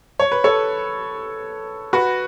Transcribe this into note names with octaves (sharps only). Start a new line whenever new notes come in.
C#5
B4
A4 C#5
F#4 B4